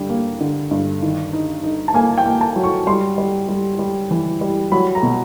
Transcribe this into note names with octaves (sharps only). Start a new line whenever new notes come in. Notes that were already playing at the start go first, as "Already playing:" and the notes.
Already playing: G2 D3 G3
A#3
D3
G2
D#3
D#4
D#4
A5
A#3 G#5
G5
A#3
A5
F#3
C#6
G3 C6
G3
G3
G3
E3
G3
F#3 B5
A#5
B2